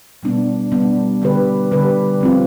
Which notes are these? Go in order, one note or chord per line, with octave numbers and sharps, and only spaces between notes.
B2 G3 B3 D4
B2 G3 B3 D4
D3 G3 D4 G4 B4
D3 G3 D4 G4 B4
F3 C4 F4